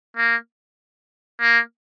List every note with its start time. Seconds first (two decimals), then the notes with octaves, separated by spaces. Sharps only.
0.17 A#3
1.41 A#3